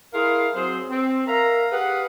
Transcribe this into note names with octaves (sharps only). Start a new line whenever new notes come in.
E4 G#4 A#4 F5 C6
F#3 C4 G#4 C5
C4
A#4 E5 F5 A#5
G4 G#4 B4 F5 F#5